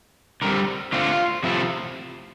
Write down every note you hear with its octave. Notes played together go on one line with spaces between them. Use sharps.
D3 G3 C4 A#4
D3 A3 C4 F4
C3 F3 A3 E4